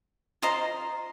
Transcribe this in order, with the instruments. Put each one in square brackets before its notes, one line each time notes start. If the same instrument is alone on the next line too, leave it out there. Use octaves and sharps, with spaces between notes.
[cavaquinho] F4 C5 D#5 A#5